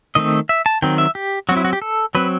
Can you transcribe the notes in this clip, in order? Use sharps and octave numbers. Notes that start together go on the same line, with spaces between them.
D#3 A3 C4 D#5
E5
A5
D#3 F#3 C4 G5
E5
G4
F#3 C4 F#4
E4
F#4
G4
A4
F#3 C4 B4